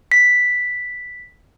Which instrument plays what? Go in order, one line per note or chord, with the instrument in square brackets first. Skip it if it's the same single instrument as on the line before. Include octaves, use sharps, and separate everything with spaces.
[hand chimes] B6